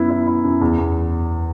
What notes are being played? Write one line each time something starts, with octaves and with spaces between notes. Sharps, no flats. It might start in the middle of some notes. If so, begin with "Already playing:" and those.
Already playing: F#2 B3 E4
E4
E4
F#2
E2
E2